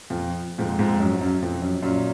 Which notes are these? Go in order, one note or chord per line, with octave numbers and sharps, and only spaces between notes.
F2
F2 G#2
F2 G#2
F#2
F#2
F2
F#2
F#2 A#2